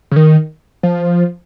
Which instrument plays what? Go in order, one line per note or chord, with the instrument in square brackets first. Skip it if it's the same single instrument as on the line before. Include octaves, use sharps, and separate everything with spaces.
[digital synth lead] C#3
D#3
F3